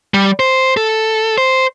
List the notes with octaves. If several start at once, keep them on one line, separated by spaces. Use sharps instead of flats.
G3
C5
A4
C5